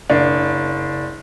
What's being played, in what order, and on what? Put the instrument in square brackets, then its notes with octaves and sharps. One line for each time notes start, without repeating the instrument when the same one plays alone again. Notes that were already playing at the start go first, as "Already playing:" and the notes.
[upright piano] F#1 D4